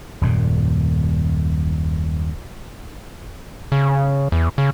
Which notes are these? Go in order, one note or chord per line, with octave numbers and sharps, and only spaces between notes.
D#1 F#2 A#2
C#3
E2
C#3